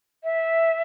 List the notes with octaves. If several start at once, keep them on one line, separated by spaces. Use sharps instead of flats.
E5